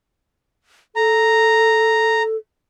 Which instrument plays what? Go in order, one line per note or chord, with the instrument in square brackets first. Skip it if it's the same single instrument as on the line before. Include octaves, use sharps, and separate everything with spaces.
[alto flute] A4 [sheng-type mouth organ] A#5